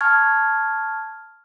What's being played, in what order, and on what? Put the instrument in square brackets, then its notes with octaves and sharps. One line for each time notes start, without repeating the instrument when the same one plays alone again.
[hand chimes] A5 C#6 F6 G#6